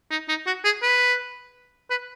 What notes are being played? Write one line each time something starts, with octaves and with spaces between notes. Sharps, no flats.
D#4
D#4
F#4
G#4
B4
B4